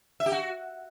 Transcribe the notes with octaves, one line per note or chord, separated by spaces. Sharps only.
E5
G4
F#4